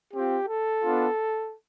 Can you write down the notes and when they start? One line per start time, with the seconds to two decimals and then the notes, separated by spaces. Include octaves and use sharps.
0.14 C4 F4 G4
0.48 A4
0.82 B3 D4 F4